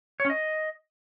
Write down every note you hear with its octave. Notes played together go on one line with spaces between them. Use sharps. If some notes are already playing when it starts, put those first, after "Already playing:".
C#5
C#4
D#5